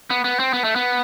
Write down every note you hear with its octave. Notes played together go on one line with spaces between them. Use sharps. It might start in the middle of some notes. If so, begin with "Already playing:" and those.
B3
B3
C4
B3
A3
B3